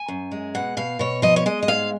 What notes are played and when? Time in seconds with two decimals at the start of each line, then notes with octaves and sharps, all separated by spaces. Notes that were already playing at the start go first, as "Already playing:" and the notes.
Already playing: G#5
0.08 F#2
0.32 G#3
0.55 B2 F#5
0.77 B2 F5
0.99 B2 C#5
1.22 F3 D#5
1.36 C#5
1.46 G#3 D#5
1.63 D#5
1.68 G#2 F5